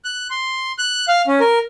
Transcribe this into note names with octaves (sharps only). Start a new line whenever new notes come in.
F#6
C6
F#6
F5
C#4
A#4